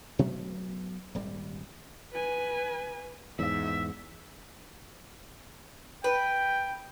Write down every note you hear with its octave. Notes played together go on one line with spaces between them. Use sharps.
B2 F#3 A3 B3
D#1 G#1 G3
B4 G#5
E2 G#2 E5
B4 G5